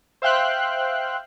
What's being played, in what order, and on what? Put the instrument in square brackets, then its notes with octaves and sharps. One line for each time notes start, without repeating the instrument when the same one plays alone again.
[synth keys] C5 E5 F5 G5 C6 F#6